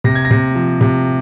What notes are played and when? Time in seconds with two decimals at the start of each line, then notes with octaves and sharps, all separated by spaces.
0.04 C3 A#6
0.15 G#6
0.25 A#6
0.31 C3
0.55 F3
0.81 C3